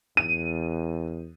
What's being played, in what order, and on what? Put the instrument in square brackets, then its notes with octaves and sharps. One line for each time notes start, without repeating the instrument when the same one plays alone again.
[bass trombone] E2 [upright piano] D#7